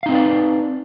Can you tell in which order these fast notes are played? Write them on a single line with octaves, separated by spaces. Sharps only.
F5 D#4 C4 B4 D5